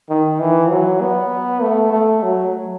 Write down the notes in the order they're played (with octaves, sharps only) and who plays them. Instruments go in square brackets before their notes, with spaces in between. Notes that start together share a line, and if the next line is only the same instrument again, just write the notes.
[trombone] D#3
E3
F#3
B3
A3
A3
F#3